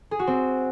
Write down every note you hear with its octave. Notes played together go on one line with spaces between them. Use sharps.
G#4
F#4
C4